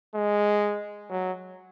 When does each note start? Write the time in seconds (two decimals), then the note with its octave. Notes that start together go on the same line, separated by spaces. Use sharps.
0.15 G#3
1.10 F#3